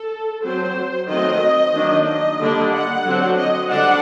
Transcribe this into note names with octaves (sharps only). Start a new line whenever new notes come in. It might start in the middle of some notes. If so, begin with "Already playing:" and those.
Already playing: A4
F#3 C4 C5
D#3 F#3 A3 C4 D#5
D#3 F#3 A#3 D4
D#5
D3 G3 A#3 D4
F#5
D3 F#3 C4
D#5
D3 G3 D4 F#5